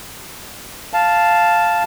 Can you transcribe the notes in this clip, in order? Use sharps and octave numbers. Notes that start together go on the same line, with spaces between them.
F5 A5